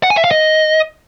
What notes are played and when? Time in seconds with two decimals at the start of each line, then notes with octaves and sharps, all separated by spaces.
0.03 F#5
0.10 G#5
0.17 E5
0.24 F5
0.31 D#5